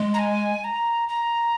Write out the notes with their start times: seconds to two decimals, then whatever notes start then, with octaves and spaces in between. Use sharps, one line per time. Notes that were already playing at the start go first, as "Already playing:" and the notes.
Already playing: G#3
0.14 A#5
0.19 G#5
0.64 A#5
1.09 A#5